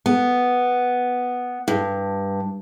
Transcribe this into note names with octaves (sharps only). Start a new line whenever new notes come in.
B3
G2